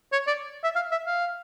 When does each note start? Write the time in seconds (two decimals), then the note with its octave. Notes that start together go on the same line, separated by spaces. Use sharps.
0.12 C#5
0.27 D5
0.64 E5
0.76 F5
0.92 E5
1.07 F5